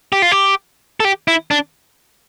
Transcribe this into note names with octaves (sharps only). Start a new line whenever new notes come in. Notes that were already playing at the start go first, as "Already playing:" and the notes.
G4
F4
G4
A4
G4
E4
D4